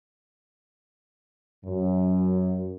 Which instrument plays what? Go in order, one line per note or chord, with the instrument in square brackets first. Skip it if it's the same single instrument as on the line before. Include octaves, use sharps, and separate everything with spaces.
[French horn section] F#2